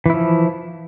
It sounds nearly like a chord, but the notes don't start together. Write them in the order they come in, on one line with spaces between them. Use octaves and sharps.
E3 E4 F3